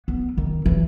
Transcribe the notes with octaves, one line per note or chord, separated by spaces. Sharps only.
B3
D#3
E3